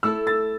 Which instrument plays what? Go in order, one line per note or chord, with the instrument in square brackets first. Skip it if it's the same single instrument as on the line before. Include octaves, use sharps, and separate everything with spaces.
[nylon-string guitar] A3 E4 A4 [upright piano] E6
[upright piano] A6